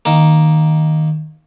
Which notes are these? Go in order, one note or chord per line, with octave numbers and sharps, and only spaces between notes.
D#3 A#3